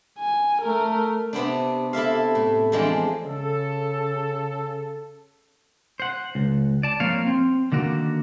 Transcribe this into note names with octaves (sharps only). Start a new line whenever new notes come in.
G#5
A3 A#4
C3 B3 C4 D4
E4 A4 E5 F5
A2
E2 F3 G#3 C4 D4
C#3 A4
C5 F#5
C#2
D5 A5
F3 A#3 C4 C#5 F5
C4
D3 D#3 A#3 F#4